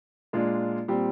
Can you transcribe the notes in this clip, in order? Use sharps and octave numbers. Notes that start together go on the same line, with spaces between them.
A#2 G#3 D4 F4
A#2 G3 C4